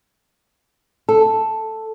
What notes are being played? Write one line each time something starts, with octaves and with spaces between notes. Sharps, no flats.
A4